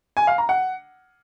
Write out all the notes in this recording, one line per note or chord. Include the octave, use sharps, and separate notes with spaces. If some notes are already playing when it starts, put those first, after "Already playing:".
G#5
F5
A#5
F#5